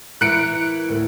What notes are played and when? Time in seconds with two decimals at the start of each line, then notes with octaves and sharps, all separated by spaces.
0.21 E3 E4 A#4 F#6 C#7 D7
0.89 D2 A2